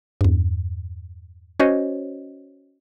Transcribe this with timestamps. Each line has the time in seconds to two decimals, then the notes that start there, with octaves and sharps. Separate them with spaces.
0.21 E2 G2
1.60 C#4 F#4 C5 C#5 D#5